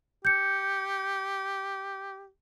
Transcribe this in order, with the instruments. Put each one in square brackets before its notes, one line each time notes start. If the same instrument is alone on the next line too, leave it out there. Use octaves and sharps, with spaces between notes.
[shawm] G4 [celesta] G6 C#7